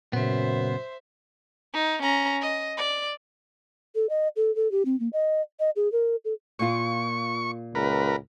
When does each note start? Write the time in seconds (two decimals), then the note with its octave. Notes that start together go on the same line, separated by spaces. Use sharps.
0.13 F#2 A#2 C#3 B3 C5 E5
1.74 D#4
2.02 C#4 A#5
2.42 D#5
2.77 D5
3.95 A4
4.10 D#5
4.36 A4
4.56 A4
4.72 G4
4.86 C4
5.00 A#3
5.13 D#5
5.60 D#5
5.76 G#4
5.92 A#4
6.25 A4
6.59 A#2 A#3 F4 C#6
7.75 C#2 A#4 B4